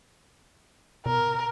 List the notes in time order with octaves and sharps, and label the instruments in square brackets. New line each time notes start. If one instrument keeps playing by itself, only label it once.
[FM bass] B2 [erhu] A#4